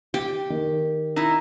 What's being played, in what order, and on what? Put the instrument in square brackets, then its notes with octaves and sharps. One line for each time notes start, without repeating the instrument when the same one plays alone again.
[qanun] G4
[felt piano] D#3
[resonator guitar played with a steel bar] D#4 E4